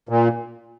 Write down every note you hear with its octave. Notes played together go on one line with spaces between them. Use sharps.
A#2